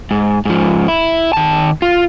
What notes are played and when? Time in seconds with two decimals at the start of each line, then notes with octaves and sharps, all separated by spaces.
0.11 G#2
0.45 G#2 F3
0.88 E4
1.33 D#3 A5
1.82 F4